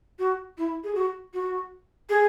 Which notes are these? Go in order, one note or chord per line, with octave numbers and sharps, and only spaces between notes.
F#4
E4
G#4
F#4
F#4
G#4